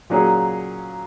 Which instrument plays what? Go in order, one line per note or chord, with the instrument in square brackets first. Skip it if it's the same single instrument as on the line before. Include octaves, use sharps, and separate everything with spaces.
[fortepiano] A#2 F#3 A#3 C#4 G#4